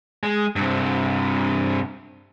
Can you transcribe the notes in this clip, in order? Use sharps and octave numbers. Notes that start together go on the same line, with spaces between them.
G#3
G2 C3